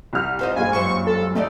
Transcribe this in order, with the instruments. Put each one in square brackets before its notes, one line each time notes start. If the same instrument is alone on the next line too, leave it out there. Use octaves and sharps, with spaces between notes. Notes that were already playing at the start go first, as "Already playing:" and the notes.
[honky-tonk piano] C2 F6
[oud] F4 C5 D#5
[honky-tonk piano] G2 A#2 G#3 [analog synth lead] G#5
[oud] F#2 F#3 C5 [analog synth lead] C#6
[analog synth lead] A4
[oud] D#2 D#4 D5 [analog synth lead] A3